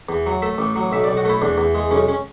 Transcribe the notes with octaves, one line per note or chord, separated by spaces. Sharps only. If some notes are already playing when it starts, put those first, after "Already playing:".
E2
F#3
A3 E5
A1
F#3
B1 E5
D5
B1
F#4
A3 E4
E2 D4
E2
G#3
B1 C#4
C#4